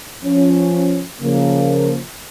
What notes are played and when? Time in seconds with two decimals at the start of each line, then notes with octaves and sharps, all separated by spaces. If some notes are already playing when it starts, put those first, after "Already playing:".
0.22 F3 C#4
1.20 C#3 F3 A#3